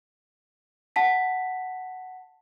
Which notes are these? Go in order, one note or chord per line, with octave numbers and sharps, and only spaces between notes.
F#5 A5 B6